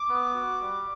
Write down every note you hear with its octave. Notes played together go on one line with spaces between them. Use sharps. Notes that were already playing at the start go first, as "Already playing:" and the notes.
Already playing: D6
B3
F#4
G3